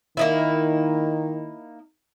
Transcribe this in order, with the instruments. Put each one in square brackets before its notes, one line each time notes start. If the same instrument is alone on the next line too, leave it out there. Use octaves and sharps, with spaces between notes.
[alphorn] D#3 [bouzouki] A#3 D#4 E4